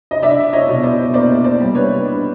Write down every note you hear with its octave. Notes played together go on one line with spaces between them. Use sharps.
D#5
D4 D5 E5
C#5 D#5
B2
C5 D5
A#3 C5 D5
C5 D5
G3
B4 C#5
D4